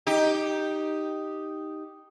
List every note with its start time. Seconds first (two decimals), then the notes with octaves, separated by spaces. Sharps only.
0.07 D#4 G4